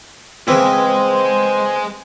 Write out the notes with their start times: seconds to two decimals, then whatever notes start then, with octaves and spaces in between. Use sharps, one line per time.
0.48 C#3 E3 G#3 C4 G#4 B4
0.88 C5